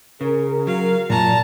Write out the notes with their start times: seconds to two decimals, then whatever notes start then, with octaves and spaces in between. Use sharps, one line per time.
0.21 C#3 G#4 A#4
0.67 F#3 F5
1.10 F#2 A#2 A5 A#5